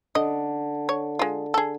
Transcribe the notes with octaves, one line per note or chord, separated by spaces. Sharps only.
D3 D#5
C#5
G#3 F4
G#4 A4